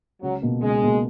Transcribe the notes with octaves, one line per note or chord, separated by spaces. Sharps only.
C#2 F#3
B2 A#3
C#2 G#3
B2 A#3